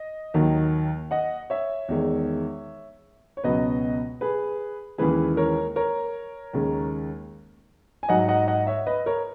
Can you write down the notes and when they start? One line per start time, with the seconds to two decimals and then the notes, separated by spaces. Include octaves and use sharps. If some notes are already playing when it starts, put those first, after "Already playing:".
Already playing: D#5
0.34 D#2 D#3 F#3
1.11 D#5 F#5
1.50 C#5 E5
1.88 E2 D#3 G#3
3.37 C#5
3.44 C#2 B2 F#3 B4 D#5
4.21 G#4 B4
4.98 D#2 C#3 E3 G#3 G#4 B4
5.37 A#4 C#5
5.76 A#4 C#5
6.53 D#2 C#3 G#3
8.03 G#5
8.09 G#2 F#3 D#5 F#5
8.28 D#5 F#5
8.48 D#5 F#5
8.67 C#5 E5
8.86 B4 D#5
9.06 A#4 C#5